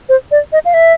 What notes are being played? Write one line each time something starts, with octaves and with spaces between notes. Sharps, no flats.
C5
D5
D#5
F5
E5